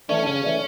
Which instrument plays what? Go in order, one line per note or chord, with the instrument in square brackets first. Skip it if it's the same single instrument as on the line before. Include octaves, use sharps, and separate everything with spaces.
[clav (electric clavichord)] E3 A3 D4 [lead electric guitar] C#4
[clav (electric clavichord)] C#3 [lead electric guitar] C#4
[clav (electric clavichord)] E3 A3 D4